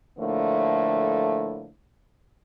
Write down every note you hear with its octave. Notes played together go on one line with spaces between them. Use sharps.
A2 D3 F3 A3 A#3